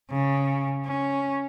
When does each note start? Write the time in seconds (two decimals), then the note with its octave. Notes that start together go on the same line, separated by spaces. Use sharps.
0.10 C#3
0.85 C#4